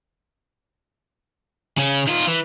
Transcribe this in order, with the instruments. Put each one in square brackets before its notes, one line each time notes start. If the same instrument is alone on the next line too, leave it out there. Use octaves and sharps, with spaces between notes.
[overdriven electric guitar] C#3 C#4
D#3 F4
E3